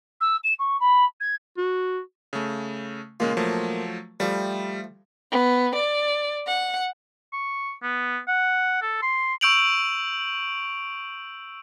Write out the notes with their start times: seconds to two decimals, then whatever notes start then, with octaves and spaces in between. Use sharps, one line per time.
0.20 E6
0.43 E7
0.59 C#6
0.79 B5
1.20 G#6
1.58 F#4
2.33 C#3 A3
3.20 A#2 C#3 G#3 F4
3.37 F3 F#3 A3
4.20 F3 G3 A3
5.31 B3
5.76 D5
6.47 F#5
7.33 C#6
7.83 B3
8.28 F#5
8.82 A4
9.02 C6
9.41 C#6 E6 G6 D7 F7 F#7